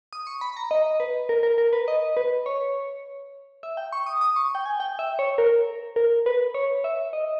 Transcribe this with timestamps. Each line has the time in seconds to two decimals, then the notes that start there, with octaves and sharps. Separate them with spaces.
0.13 D#6
0.27 C#6
0.41 B5
0.57 A#5
0.71 D#5
1.00 B4
1.29 A#4
1.43 A#4
1.58 A#4
1.73 B4
1.88 D#5
2.17 B4
2.46 C#5
3.63 E5
3.77 G5
3.92 C#6
4.06 D#6
4.21 D#6
4.36 C#6
4.55 G5
4.66 G#5
4.80 G5
4.99 E5
5.19 C#5
5.38 A#4
5.96 A#4
6.26 B4
6.54 C#5
6.84 E5
7.13 D#5